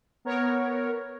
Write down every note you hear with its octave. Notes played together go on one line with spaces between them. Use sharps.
B3 A#4 C#5